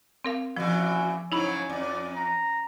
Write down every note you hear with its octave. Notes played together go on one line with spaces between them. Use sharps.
C4 A#4 F5
A#2 C#3 E3 F3 F#4
G#2 C#3 F#3 D#4 E4 C#5 B5
F2 D5
A#5